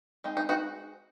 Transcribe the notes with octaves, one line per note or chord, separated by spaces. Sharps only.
G#3 C4 D#4
D#4
D#4 F#4